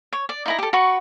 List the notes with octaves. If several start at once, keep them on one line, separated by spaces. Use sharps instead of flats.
C#5
D5
D#4 E4 A#5
G4 A4
F#4 B4 C#6